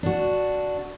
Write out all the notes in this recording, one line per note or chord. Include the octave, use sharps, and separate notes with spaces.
D4 F#4